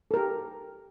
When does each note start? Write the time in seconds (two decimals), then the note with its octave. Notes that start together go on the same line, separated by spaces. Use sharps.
0.11 A4
0.14 A#4
0.17 G4